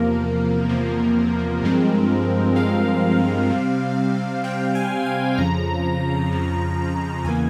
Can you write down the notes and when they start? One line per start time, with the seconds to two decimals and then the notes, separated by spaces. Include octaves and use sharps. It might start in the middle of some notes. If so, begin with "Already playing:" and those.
Already playing: E2 C3 F3 A#3 A#4
0.69 E2 C3 F3 A#3
1.62 G2 F3 G#3 C4
2.56 G2 F3 G#3 C4 F5
3.50 C3 G3 C4
4.44 C3 G3 C4 G5
4.75 G#5
5.06 G#5
5.37 F2 C#3 F3 A#5
6.31 F2 C#3 F3
7.24 E2 C#3 E3 A#3 G#5